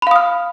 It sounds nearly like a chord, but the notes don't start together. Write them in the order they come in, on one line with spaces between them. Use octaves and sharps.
B5 F5 D#6 F6